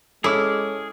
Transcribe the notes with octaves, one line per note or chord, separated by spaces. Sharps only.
G#3 C#4 E4 G#4 A4 D6 F6